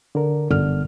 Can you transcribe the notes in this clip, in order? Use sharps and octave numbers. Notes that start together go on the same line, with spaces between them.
D3 A#4
G1 D3 F6